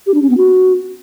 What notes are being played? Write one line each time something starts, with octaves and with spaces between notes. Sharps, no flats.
G4
D4
C#4
B3
F#4